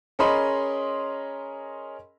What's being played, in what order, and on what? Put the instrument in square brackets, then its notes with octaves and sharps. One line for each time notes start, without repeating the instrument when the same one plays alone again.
[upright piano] C#4 G#4 A#4 D#5 B5 C6